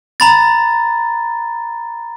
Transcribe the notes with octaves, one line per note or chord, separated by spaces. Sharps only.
A#5 B5 A6